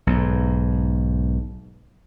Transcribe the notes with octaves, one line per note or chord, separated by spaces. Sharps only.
B1 G#2